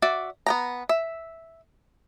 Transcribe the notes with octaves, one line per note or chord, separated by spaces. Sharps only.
F#4 D5 E5
B3 G5 A#5
E5